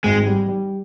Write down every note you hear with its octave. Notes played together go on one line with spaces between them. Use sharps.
G#1 G#3
G3
G3